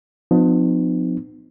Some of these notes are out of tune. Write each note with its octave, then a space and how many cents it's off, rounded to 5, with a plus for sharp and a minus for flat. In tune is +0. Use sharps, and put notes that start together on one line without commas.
F3 +30 B3 +40 D#4 -35